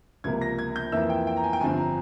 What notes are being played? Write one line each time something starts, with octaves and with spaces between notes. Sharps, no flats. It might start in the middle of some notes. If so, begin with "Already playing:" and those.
C#2 C3 F3 A#3 G#6
A#6
G#6
G6
F2 E3 A#3 E4 E6
G5
G5
A#5
G#5
G5
G1 G2 F3 C4 G#5
A#5